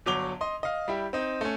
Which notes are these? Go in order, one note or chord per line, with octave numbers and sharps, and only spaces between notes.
G1 F#3 C#5 D6 F7 G7
D#5 C6
D#5 F5
G3 E4 G4
C4 D#4
A3 C#4